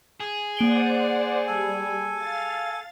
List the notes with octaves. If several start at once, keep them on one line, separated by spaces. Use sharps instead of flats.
G#4
A#3 C5 D5 F#5 D7 G7
G3 A4 G#5
F5 A6